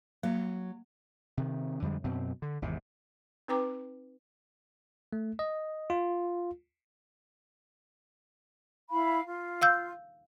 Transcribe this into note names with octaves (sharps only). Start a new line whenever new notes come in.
F#3 A#3
C3 D#3
F2 D3 G3 G#3
F#2 B2 C4
D3
G#1 E2 C3
C4 D#4 B4 G5 A#5 D6
A3
D#5
F4
E4 F5 B5
F4
F5 E6 G6